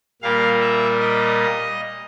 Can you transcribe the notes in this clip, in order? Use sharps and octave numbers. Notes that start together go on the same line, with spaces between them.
A#2 G3 A#3 F5
E5
D#5